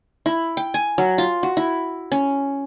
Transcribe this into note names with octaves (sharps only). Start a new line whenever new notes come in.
E4
G5
G#5
F#3
F4
F#4
E4
C#4